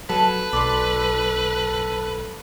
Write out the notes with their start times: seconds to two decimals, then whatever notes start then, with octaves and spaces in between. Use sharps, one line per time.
0.09 F#3 A4 B4
0.53 B1 A4 D5 C6